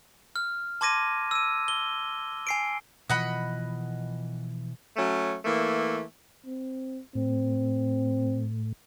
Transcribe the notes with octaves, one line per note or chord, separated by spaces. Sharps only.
F6
A5 C6 D6 G#6 A#6 D#7
E6 D#7
G7
G#5 C7 D7
B2 E3 F3 D#5 F#5 B5
F#3 A3 C#4
E3 A3 A#3
C4
A2 C4